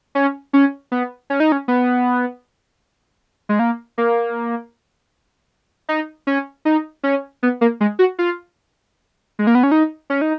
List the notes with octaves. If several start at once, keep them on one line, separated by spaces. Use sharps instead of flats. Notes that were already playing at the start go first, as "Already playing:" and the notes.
C#4
C#4
B3
C#4
D#4
C#4
B3
G#3
A#3
A#3
D#4
C#4
D#4
C#4
B3
A#3
G#3
F#4
F4
G#3
A#3
B3
C#4
D#4
C#4
D#4